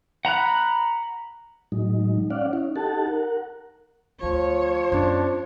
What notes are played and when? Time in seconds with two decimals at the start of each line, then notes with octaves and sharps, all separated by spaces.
0.25 F#5 A#5 B5 F#6
1.72 A2 F#3 G#3 D#4
2.30 C#4 D5 F5 F#5
2.53 C#4 D#4 E4
2.76 D#4 G4 A4 F#5 A5
3.07 A#4 F#5
4.23 D2 F3 C#5
4.92 F#2 B3 D4